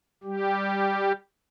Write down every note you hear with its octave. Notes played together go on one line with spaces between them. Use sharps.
G3 G4